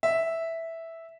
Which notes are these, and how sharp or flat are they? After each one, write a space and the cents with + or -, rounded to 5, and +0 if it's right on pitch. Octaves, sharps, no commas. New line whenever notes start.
E5 -5